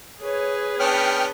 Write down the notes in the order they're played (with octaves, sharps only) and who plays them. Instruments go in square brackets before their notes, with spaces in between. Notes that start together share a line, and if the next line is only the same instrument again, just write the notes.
[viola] G#4 B4 [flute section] C#5
[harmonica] B3 C#4 D4 [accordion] G5 F6